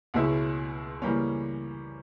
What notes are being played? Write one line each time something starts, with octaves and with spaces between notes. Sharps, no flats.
C#2 B2 G#3 C#4 E4
C#3 E3 G3 A#3 C#4